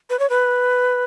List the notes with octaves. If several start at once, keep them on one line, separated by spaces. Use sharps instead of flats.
B4
C#5
B4